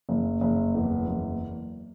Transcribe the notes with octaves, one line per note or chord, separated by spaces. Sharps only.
F#1
F#1
E2
F#1